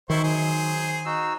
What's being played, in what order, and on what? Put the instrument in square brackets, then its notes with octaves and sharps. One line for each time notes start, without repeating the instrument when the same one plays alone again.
[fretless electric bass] D#3 [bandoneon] F#3 [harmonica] E4 C5 C#6
[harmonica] G#4 C5
[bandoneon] D#4 F#4 E6